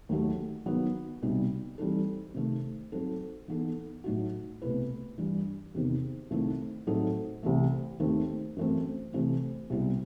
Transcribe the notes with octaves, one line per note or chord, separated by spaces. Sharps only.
D#2 D#3 F#3 A3
D#3 F#3 B3
C2 B2 G3 D#4
E3 G3 C4 D#4 A4
C3 D#3 A3 C4
F#3 C4 D#4 A4
E3 B3 D#4 A4
A2 F#3 A3 D#4 F#4
C2 B2 A3 E4 B4
G2 E3 G3
E2 C3 D#3
C2 C3 D#3 A3 E4
A2 F#3 C4 D#4 A4
C2 C3 E3 A3
D#2 D#3 A3 C4
F#2 E3 A3 C4
C3 E3 A3 C4 E4
C2 B2 G3 C4 E4